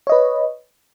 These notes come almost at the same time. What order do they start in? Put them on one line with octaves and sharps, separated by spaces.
C#5 D#5 B4